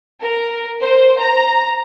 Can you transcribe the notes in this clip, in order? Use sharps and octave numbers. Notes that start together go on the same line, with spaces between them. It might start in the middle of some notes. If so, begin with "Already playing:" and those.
A#4
C5
A#5